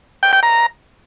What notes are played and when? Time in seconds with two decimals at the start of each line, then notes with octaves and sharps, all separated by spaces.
0.23 G5
0.33 G5
0.43 A#5